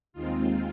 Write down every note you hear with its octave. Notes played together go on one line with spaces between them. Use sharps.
D#2 D#3 G#3 C4 F4